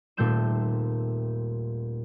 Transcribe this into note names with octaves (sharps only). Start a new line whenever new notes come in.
D#1 A#2 A3 C4 G6 E7